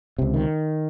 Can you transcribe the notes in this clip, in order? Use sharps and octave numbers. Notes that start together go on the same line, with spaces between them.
C#2 C3
D#3